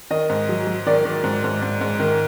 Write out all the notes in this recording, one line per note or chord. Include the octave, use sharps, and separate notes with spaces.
D#3 D#5
G#2
F#3
F#3
D#3 D5
D#3
G#2
G#2
G#2
G#2
D#3